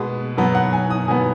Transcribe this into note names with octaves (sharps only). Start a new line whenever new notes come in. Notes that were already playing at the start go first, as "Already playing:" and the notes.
Already playing: B2 G#3 B3
B2 F#3 B3
F#5
G#5
D#6
B2 F#3 B3 G#5